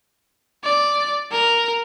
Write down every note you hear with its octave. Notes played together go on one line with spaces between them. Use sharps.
D5
A#4